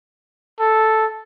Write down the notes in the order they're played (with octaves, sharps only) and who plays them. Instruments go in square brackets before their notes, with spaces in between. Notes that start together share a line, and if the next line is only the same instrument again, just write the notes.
[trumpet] A4